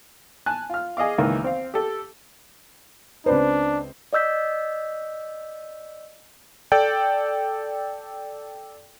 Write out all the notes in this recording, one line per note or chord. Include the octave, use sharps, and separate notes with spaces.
G#5 A5 F#6
F4 F6
G#4 D#5 F5 D6
C#2 D#3 E3 A#3
C4 F5
G4 A4
C#2 C4 D4 B4 C5 D5
D5 D#5 E6 G6 B6
A4 D5 G5